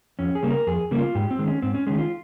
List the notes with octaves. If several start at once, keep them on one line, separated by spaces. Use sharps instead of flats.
F2 C#4
G#4
C#3 G3 A#3
A#4
F2 G#4
C#3 G3 A#3
F4
G#2 G4
C4
D#3 G#3
C#4
G#2 C4
C#4
D#3 G#3 C#4
F4